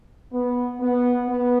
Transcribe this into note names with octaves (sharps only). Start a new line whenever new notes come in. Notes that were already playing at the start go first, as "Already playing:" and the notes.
B3
B3
B3